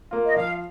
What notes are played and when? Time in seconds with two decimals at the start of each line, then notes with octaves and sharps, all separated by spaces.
0.11 A#3 F4
0.25 D#5
0.36 F3 F5